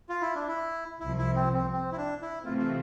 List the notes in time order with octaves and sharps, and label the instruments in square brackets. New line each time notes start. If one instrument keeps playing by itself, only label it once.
[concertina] F4
E4
D4
E4
[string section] C2 C3 F3 [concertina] E4
[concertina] E4
C4
C4
C4
E4
D4
E4
[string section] C3 E3 A3 C4 [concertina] F4
[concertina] F4